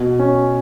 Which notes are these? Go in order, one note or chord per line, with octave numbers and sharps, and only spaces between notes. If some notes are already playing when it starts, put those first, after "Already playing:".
Already playing: B2
C#4